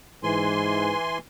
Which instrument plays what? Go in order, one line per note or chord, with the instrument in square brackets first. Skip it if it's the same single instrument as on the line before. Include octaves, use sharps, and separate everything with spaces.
[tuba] G#2 [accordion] E3 G#5 C6